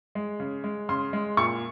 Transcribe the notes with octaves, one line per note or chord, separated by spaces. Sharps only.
G#3
C#3
G#3
C#3 C6
G#3
A#2 C#6